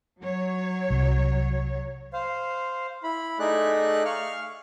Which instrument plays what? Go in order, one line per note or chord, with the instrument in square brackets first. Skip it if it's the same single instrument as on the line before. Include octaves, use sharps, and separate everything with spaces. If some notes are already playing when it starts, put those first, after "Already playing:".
[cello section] F#3 C#5
[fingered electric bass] C2
[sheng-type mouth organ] C5 F5
E4 B5
A3 D#4 G#4 D5 F#6
F5 C#6 F6